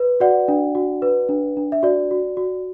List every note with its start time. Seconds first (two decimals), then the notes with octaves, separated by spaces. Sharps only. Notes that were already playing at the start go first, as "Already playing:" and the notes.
Already playing: B4
0.20 F#4 D5 F#5
0.48 D4
0.75 F#4
1.02 B4
1.29 D4
1.57 D4
1.72 E5
1.83 F#4 D5
2.11 F#4
2.37 F#4